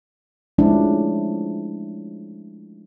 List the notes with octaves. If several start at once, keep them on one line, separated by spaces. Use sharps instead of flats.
F3 G#3 A3 C#4 D4 E4